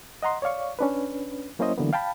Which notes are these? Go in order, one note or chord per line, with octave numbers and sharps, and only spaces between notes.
D#5 F#5 A#5 C6
C#5 D5 F5 C#6
C#4 D4 B4
F#3 A#3 C#4 E4 C5 D#5
D3 E3 F#3 A#3 B3
F5 G5 A5 B5